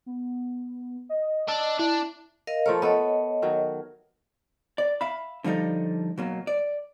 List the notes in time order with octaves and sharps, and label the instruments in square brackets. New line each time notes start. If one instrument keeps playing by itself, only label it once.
[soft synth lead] B3
D#5
[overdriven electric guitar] D4 [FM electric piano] E6
[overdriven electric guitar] D4 [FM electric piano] E4
[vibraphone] A#4 D#5 F5
[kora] F3 A3 A#4 [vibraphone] C#5
[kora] A3 B3 [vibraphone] C#5 D#5
[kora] D#3 F#3
[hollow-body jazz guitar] D5
E5 F5 B5
D3 F3 G3 D#4 A4
B2 F#3 A#3
D5